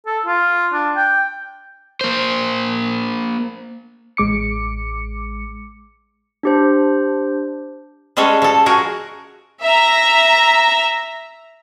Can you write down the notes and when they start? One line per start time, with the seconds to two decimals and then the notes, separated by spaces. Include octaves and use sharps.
0.06 A4
0.26 F4
0.73 D4
0.96 G5
2.01 A#3 C5
4.17 A1 G#3 D6 C#7
6.43 D4 G4 C5
8.17 G3 G#3 C#4 G#4 A4
8.42 F3 A4
8.66 F#4 G#4 A#4
9.63 E5 A#5